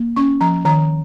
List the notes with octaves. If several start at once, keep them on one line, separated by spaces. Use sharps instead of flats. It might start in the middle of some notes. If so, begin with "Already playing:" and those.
Already playing: A#3
C#4 C#6
F3 A#5
D#3 A#5